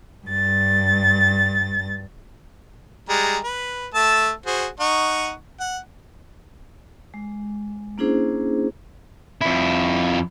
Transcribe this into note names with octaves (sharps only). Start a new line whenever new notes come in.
G2 A6
G3 G#3 A#5
B4
A3 A5 E6
F#4 G#4 C5
D#4 F#5 C#6
F#5
G#3
A#3 C#4 D4 E4 G#4 C5
F2 E4